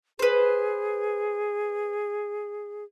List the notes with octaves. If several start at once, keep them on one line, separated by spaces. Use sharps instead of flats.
G#4 B4 C5